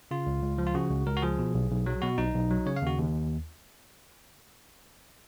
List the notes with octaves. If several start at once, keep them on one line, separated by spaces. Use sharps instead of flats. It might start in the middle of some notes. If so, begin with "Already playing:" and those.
C#3 F4
C#2
C#2
F3
F4
C#3 F#4
C#2
C#2 A#4
F#4
F3 G#4
B2
B1
B1
F#3
B2 F#4
B1 D#4
B1
F#3
C#3 C#5
F5
D#2 F#4
D#2